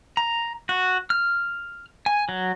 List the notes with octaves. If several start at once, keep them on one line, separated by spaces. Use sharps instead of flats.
A#5
F#4
F6
G#5
F#3